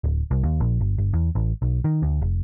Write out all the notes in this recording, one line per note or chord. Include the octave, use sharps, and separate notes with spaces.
D1
C2
D#2
A#1
G1
G1
E2
A1
B1
D#3
D2
F1